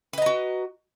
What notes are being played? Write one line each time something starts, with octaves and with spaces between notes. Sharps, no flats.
F#4 B4 D#5 A#5